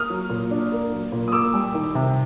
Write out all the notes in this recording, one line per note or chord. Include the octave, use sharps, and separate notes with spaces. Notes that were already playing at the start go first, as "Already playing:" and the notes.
Already playing: A#3 D#6 F6
F#3
A#2
D4
A#3
F#3
A#2
D#6
A#3 D6 E6
G3
D#3
C3